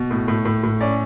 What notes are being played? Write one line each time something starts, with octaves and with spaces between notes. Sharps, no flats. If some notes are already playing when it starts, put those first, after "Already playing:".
Already playing: B2
A2
A2
A2
A2
C#4 D5